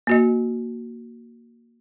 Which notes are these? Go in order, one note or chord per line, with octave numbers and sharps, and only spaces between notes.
A#3 F#4 D#5